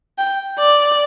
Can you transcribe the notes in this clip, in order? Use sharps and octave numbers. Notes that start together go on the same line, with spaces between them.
G5
D5